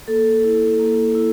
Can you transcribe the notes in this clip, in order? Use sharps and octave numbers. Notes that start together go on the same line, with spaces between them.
A#3 A4
E4
A#3
E4